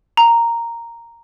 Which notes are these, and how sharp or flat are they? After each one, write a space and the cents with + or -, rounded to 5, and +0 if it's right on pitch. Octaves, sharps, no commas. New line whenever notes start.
A#5 -5